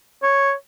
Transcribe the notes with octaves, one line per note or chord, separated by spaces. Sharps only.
C#5